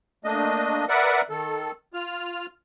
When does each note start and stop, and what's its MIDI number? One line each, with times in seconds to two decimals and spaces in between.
0.24 0.85 57
0.24 0.85 58
0.24 0.85 62
0.24 0.85 75
0.89 1.21 70
0.89 1.21 71
0.89 1.21 74
0.89 1.21 76
0.89 1.21 78
1.30 1.72 51
1.30 1.72 69
1.93 2.46 65
1.93 2.46 89